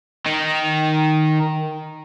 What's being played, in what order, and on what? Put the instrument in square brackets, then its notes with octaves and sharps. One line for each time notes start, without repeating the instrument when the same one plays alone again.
[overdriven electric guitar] D#3